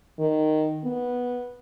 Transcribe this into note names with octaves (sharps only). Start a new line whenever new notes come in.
D#3
B3